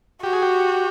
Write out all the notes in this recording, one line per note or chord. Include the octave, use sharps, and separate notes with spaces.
F#4 G4
G#4
G4